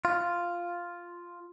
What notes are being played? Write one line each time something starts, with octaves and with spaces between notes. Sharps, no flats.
F4